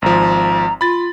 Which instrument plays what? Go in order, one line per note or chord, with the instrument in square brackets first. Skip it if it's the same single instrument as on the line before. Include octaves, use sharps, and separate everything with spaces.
[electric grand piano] G#1 F3 [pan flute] A#5
[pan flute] F4 [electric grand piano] B5 A6